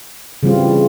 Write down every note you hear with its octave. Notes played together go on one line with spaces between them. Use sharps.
C#3 E3 G3 C4 F4